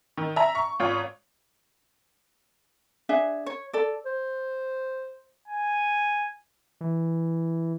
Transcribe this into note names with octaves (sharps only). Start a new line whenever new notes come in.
D#3
E5 A#5
C#6
G#1 F4 C#5
D4 G#4 E5
C#5
A4 D5
C5
G#5
E3